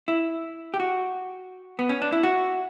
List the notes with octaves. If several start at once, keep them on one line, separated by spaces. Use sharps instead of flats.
E4
G4
F#4
B3
C#4
D4
E4
F#4